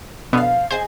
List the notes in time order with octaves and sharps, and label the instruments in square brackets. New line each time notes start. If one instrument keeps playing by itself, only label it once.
[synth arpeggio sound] B2 D3 B3 [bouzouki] F3 F5
[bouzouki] G#4 D#5 G#5 [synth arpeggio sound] C5